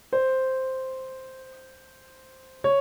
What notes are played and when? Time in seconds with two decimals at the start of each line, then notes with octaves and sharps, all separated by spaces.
0.13 C5
2.64 C#5